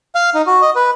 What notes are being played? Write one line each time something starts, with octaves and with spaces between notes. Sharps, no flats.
F5
D#4
F#4
D#5
B4